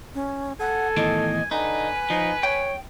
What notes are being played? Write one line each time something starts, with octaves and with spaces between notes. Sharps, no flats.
C#4
A4 F#5 G#5
E2 A2 D#3 D#5
D3 D#4 B4 G#5
F3 D#4
C#5 G5